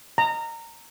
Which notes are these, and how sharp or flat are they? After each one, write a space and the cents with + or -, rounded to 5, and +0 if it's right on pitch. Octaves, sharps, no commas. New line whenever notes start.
A#5 -20